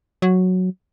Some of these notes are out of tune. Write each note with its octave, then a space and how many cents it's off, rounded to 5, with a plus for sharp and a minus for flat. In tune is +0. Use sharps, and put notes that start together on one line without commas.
F#3 -5